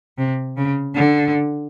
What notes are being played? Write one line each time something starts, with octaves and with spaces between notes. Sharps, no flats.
C3
C#3
D3